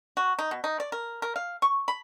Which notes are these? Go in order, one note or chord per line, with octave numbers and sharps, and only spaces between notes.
F#4
D#4
B2
D#4
D5
A#4
A#4
F5
C#6
B5